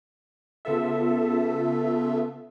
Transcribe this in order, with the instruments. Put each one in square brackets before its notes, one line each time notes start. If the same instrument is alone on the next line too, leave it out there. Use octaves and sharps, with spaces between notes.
[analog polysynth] C#3 B3 F4 A4 E5